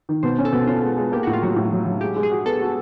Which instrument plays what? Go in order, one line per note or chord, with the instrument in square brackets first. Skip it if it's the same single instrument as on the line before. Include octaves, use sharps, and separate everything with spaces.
[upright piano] D#3
[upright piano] B2 [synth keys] C5
[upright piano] C#4
[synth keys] A4
[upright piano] B2
[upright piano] C#4 [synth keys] F4
[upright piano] G#3
G#3
[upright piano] A#3 [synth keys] G4
[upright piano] A2 [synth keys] F#4
[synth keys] F4
[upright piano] F#3 [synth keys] F#4
[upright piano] A2
F#3
F#3
[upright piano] G#3 [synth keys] G4
[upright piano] G#3
[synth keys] G#4
[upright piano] F#4
[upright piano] B3 [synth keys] A4
[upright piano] F#4